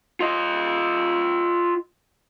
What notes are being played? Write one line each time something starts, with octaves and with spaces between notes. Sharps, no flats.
F4 D#5